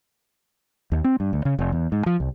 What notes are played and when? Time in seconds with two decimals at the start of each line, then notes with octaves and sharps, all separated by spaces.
0.92 D#2
1.04 C4
1.20 G2
1.33 D2
1.45 C#3
1.59 F1
1.72 E2
1.92 G#2
2.06 F3
2.20 C2